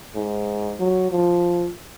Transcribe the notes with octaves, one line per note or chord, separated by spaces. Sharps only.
G#2
F#3
F3